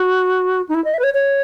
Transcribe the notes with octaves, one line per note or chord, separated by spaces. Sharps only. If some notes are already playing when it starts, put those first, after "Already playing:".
Already playing: F#4
D#4
E4
D#5
E5
B4
C#5
C#5